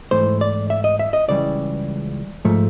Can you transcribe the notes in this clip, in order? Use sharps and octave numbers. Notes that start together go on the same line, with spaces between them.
G#2 E3 A3 C5
D5
E5
D#5
E5
D#5
C#2 C#3 E3 G3 D5
G#2 F3 A3